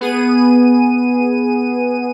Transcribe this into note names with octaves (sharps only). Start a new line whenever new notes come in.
B3 G#4 D#7